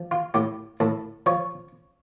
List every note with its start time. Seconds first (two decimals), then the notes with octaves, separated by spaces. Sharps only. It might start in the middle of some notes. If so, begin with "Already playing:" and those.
Already playing: F3
0.11 F4
0.34 A2 G4
0.80 A2 A4
1.26 F3 C#5